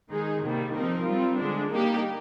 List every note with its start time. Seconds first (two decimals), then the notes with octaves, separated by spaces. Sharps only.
0.11 D#3 G#3 D#4 G#4
0.44 C3 D#3 G3 A#3
0.75 F3 C4 D#4 A#4
1.06 G3 C4 F4
1.38 D3 G#3 D4
1.70 G3 A#3 D#4 G4